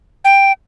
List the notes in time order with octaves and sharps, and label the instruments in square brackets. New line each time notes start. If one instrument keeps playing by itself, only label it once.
[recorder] G5